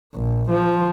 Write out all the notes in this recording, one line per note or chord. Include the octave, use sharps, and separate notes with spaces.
A#1
F3